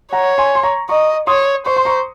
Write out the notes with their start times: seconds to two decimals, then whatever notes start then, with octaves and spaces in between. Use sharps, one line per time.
0.13 C#5 F#5 A#5
0.38 G#5 C6
0.55 C6
0.63 A#5 C#6
0.89 D#5 A#5 C#6
1.27 C#5 C6 D#6
1.66 C5 C#6
1.77 C6
1.85 A#5 C#6